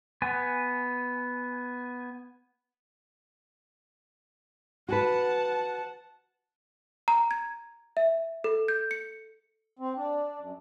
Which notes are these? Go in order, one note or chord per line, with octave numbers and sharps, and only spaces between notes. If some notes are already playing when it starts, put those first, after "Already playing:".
B3 G#5
F#4 B4 F#5 A5
A#5
G#6
E5
A4
G6
C#7
C4
D4
F#2